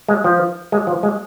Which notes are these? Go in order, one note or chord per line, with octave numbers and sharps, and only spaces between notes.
G#3
F3
G#3
F3
G#3